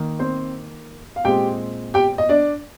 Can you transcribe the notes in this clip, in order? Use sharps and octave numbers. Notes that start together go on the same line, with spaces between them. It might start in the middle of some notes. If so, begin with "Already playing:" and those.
Already playing: D#3 A#3
C4 C5
F5
A#2 G#3 C4 G4 G5
G4 G5
D#5
D4 D5